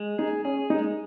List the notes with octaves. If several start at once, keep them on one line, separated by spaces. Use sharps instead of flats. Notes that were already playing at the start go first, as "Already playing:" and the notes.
Already playing: G#3
D#4 G#4
C#4 G#4
G#3 D#4